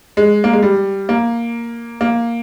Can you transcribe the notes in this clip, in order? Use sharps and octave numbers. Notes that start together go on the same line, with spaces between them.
G#3
A#3
G#3
G3
A#3
A#3